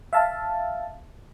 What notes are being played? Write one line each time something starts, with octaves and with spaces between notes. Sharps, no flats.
E5 F5 A5